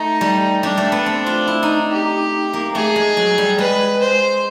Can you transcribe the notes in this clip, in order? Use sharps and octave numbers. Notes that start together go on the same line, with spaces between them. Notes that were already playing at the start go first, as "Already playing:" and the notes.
Already playing: A3 D#4
G3
G3 D4
A3
B3
C4
F4
E4
D#4
G4
A#3
A3 G#4
G#3
F#3
G3
G#3 B4
C5